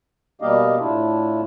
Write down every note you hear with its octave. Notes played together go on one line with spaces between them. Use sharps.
B2 G3 A#3 G4 D#5 F5
A2 A3 D4 E4 F4